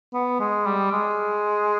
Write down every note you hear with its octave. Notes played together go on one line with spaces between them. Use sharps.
B3
G#3
G3
G#3